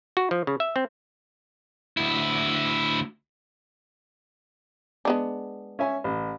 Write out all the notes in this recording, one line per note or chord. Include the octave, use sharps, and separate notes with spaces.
F#4
F3
C#3
E5
C4
D2 E4
G#3 B3 D4
C#4 E5 G#5
A1